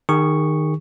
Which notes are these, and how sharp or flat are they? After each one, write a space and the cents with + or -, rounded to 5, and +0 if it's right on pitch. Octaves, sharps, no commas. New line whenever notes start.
D#3 -15 G#4 -40 C#6 +0